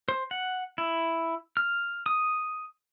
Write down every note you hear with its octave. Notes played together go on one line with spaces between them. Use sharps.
C5
F#5
E4
F6
D#6